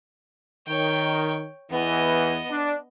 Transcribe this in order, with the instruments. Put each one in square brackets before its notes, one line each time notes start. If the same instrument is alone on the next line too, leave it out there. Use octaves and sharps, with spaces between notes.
[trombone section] D#3 [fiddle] C#5 G5
[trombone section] E2 E3 [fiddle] B3 D#5
[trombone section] D4